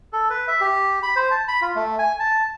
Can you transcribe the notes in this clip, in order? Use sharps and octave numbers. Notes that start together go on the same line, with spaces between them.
A4
B4
E5
G4
B5
C5
A5
B5
F4
A3
G#5
A5